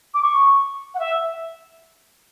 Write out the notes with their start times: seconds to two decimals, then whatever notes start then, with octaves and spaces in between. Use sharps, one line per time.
0.14 D6
0.23 C#6
0.95 F#5
0.99 E5